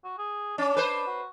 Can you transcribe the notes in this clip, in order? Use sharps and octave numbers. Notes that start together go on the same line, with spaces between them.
F#4
G#4
C#4 D4
B4 C5
F#4